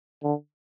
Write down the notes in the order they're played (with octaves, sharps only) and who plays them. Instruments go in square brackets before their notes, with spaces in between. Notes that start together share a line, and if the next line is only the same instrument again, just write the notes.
[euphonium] D3